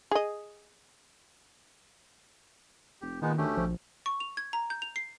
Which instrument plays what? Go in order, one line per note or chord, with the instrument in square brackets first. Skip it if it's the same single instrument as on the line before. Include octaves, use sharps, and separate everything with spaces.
[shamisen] G#4 D#5
[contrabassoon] F1 [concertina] G4
[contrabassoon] A#2 [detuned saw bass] D#3 [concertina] G#3 B3 D#4
[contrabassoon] D2 [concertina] A3 C#4 G4
[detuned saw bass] A#1 [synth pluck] F3
[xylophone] C#6
F7
G#6
A#5
G6
F7
C7